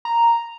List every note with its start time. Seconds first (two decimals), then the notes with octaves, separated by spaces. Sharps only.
0.05 A#5